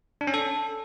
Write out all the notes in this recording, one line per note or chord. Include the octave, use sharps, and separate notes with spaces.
D4
C#4
A4